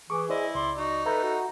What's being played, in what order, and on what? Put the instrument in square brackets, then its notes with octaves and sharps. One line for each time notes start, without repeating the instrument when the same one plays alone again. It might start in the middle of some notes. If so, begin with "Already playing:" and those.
[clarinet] E3 [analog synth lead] G#4 [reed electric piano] C#6 D6
[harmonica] E4 [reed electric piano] C5 D5 [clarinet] D#5
[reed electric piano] C#2 [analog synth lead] D5 [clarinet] C6
[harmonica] D#4 [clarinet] F#4
[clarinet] A4 [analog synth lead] B4 [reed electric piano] E5 A#5 G6
[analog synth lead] F#4